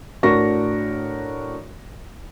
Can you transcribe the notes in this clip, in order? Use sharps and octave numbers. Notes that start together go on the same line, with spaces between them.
A2 D4 F#4 A#4 C#6 A#6